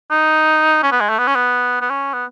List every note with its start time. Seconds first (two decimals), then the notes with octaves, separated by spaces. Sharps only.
0.11 D#4
0.83 C#4
0.92 B3
1.01 G#3
1.09 A3
1.18 B3
1.27 C#4
1.36 B3
1.81 B3
1.90 C#4
2.13 B3